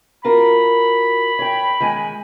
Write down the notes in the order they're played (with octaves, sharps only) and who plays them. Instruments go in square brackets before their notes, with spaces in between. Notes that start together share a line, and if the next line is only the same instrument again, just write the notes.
[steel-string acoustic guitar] F4 F#4 A#4 [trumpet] B5
[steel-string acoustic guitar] C#5 G5
D#3 G#3 G#5